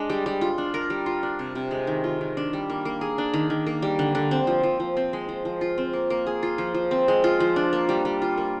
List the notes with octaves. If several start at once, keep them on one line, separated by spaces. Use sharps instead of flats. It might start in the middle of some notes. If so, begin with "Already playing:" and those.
Already playing: G#3 D4
G3
G3
F4
D4
A#4
G3
F4
D4
C3
C3
G#3
D#3
F4
D#3
D4
G3
A#3
A#3
G#4
D4
D#3
D#3
A#3
G3
D3
D3
C4
F3
F3
F3
C4
G#3
F3
F3
F4
C4
A#3
A#3
G#4
F4
F3
F3
C4
G#3
F4
F3
D4
A#3
G3
G3
F4
A#3